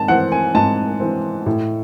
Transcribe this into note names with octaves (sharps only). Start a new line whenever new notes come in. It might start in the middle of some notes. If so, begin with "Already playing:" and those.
Already playing: G#2 A5
E3 C4 F#5
G#5
G#2 A5
E3 C4
A2